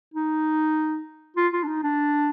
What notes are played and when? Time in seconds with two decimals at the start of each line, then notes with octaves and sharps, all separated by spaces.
0.14 D#4
1.36 F4
1.53 F4
1.63 D4
1.68 D#4
1.83 D4